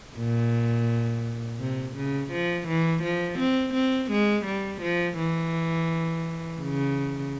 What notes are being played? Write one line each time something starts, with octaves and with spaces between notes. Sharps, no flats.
A#2
C3
C#3
F3
E3
F3
C4
C4
G#3
G3
F3
E3
C#3